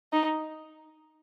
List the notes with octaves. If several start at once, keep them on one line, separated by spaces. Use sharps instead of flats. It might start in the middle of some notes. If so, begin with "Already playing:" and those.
D#4